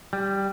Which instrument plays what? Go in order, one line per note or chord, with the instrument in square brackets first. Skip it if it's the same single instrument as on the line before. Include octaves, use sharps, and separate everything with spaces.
[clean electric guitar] G3